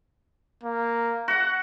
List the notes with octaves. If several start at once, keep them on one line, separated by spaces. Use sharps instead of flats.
A#3
F#4 F#5